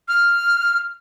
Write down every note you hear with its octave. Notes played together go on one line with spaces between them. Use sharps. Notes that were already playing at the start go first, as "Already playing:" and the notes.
F6